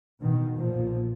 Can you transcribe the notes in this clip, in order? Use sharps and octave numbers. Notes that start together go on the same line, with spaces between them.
B2 D#3
B1 A#2 F3